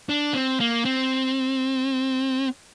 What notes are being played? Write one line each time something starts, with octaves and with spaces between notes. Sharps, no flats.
D4
C4
A#3
C4